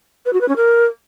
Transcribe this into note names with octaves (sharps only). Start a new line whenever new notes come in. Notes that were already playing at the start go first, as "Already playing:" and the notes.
B4
F#4
B4
C#4
A#4